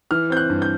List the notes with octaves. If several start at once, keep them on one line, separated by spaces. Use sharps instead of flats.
E3 F6
C4 G6
F#6
G2
G6